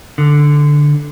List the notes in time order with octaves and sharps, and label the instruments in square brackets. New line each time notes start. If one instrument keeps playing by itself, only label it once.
[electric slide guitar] D3